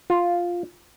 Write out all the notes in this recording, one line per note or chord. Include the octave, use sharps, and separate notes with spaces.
F4